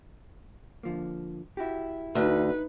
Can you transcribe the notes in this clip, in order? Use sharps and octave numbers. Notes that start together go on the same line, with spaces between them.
D3 F3 A#3
E4 F#4 G4
D2 D#4 B4